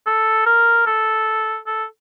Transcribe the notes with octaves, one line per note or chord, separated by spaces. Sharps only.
A4
A#4
A4
A4